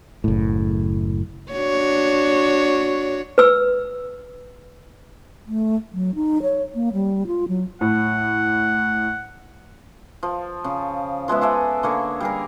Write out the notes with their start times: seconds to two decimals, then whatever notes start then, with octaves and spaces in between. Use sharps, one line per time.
0.24 F#1 A2
1.52 D4 F#4 C#5
3.38 B4 E6
5.47 A3
5.93 F#3
6.15 D#4
6.43 C#5
6.75 A#3
6.93 G3
7.27 F4
7.48 F#3
7.81 A2 F#5
10.23 F3
10.64 C#3
11.28 F3 G#3 B3 E5
11.41 G#4 A4 D5 E5
11.83 D3 A#3 C#5
12.20 G3 G#4 A#4